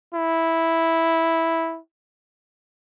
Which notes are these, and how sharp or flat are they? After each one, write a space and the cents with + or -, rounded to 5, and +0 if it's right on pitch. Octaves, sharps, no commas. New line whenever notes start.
E4 -5